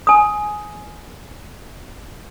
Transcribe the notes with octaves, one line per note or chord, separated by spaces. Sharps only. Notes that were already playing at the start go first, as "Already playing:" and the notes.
G#5 D#6